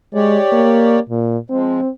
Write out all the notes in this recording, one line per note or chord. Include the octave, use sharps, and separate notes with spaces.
G#3 G4 C#5 D5
A#3
A#2
F3 G#3 C4